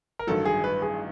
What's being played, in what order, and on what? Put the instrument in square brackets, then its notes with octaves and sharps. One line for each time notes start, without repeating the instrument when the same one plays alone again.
[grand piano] A#4
[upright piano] A1 G2 D#3 F#3 [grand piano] A4
[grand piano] G#4
B4
G#4